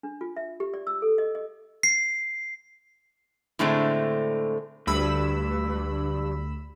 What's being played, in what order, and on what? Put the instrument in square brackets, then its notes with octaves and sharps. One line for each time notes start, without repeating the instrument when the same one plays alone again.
[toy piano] D4
F4
E5
G4
D5
E6
A4
D#5
D#5
[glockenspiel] C7
[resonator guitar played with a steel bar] A2 D3 G#3 A3 C4
[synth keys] D2 B5 E6 [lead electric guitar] G2